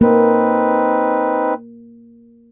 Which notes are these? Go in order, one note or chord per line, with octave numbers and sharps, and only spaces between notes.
A#3 C4 D#4 B4